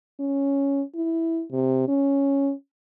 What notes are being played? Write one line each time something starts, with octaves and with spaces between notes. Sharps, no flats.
C#4
E4
C3
C#4